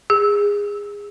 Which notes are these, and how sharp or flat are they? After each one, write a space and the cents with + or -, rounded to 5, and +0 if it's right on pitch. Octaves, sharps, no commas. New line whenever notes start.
G#4 -20